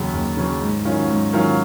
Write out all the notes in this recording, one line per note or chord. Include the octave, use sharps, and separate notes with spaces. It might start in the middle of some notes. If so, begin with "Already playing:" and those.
Already playing: D#2 C#3 F#3
D#2
C#3 F#3
G#2
D#3 F#3 C#4 F4
G#2
D#3 F#3 C#4 F4